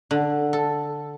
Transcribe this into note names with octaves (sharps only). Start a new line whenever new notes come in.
D3
A4